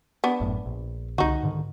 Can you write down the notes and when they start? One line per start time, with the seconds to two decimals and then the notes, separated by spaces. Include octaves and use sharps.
0.24 B3 D4
0.40 G#1 F#2 A2
0.66 A#1
1.18 C2 D3 D#4 F#4
1.43 G#2 D3 D#3